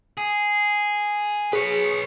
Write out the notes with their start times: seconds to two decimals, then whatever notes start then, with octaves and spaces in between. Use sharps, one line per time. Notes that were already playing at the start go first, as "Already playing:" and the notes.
0.18 G#4
1.53 G#4 B4 C#5